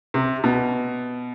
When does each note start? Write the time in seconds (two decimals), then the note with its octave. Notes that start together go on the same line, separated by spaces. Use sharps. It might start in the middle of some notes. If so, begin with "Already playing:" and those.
0.14 C3
0.44 B2